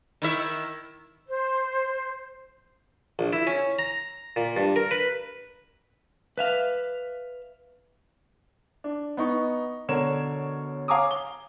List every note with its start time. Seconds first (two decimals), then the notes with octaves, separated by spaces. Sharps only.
0.22 D#3 E4 E5
1.28 C5
3.19 A#1
3.33 E4
3.47 C#4
3.79 A#5
4.36 A#2
4.57 G2
4.76 A#4
4.91 B4
6.38 B4 E5 F5
8.84 D4
9.17 B3 D#4 C#6
9.88 B2 D3 A#4 C#5 E7
10.88 C#5 F5 G#5 A#5 D6 D#6
11.11 G7